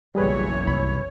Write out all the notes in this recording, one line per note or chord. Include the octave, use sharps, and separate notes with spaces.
F#1 B1 E3 G3 G#4 B4 C#5
C2 B5